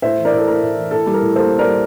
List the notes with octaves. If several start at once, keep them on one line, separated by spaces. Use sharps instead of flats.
A2 C5 E5
E3
A#4 D5
A2
A4
A3 A#4
A2
E3
A2 A4
G3
A#4
A2
A#3 A4 C5
A2
A#4 D5
G3